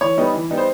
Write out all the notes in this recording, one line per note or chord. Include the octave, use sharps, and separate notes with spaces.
E3 C#5
G3 B3 D#4
E3
G3 B3 D#4
C5